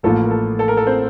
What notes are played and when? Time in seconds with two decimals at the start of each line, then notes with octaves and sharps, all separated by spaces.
0.03 A1 A2 F3 A#3 F4 A4
0.24 A#4
0.31 A4
0.59 A4
0.68 A#4
0.77 A4
0.87 C4 C5